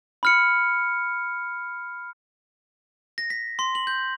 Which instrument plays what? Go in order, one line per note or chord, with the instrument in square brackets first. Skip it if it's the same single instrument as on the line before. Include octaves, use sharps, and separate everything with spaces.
[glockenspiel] B5 F6 C#7
A#6
B6
C6
F#7
G6